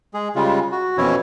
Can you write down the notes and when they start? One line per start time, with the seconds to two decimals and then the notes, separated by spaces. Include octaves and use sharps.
0.14 G#3 G#4
0.35 C#3 G3 G#3 F4
0.72 F#4
0.97 F2 B2 E3 C#4 E4 C#5